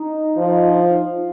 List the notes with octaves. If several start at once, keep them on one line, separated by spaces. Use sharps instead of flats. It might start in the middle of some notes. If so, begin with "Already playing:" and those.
Already playing: D#4
F3